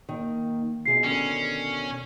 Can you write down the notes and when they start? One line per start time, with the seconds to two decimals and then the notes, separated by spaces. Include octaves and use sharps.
0.09 D#3 A#3
0.86 B2 F4 G#4 D#5 C7
1.04 D3 D#3 C#4